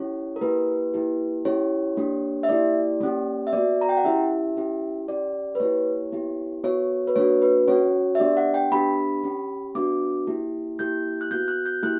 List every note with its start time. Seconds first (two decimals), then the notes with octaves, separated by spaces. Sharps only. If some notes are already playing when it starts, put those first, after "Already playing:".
Already playing: C#4 E4 G4 C#5
0.36 A#4
0.41 A#3 E4 G4 B4
0.94 A#3 E4 G4
1.45 C#4 E4 G4 C#5
1.97 A#3 D4 G4
2.43 E5
2.49 A#3 E4 G4 D5
3.01 A#3 C#4 G4
3.47 E5
3.53 B3 F#4 D5
3.81 A#5
3.89 G5
3.97 F#5
4.04 C#4 E4 G4 E5
4.57 C#4 E4 G4
5.08 C#4 G4 D5
5.55 B4
5.60 A#3 E4 G4 C#5
6.12 B3 E4 G4
6.64 B3 F#4 C#5
7.07 B4
7.16 A#3 D4 F#4 C#5
7.42 B4
7.68 C#4 F#4 C#5
8.15 E5
8.20 B3 D4 G4 D5
8.37 F#5
8.54 G5
8.72 B3 D4 G4 B5
9.24 C#4 G4
9.75 B3 D4 F#4 D6
10.27 A#3 E4 G4
10.79 A#3 E4 G4 G6
11.21 F#6
11.31 B3 F#4 G6
11.48 F#6
11.66 G6
11.83 A#3 E4 G4 F#6